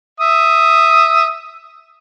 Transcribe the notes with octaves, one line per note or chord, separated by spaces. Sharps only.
E5 D#6